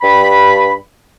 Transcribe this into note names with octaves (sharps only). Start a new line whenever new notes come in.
G2 B5